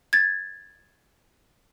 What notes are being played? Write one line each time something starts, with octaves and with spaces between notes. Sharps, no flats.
G#6 A6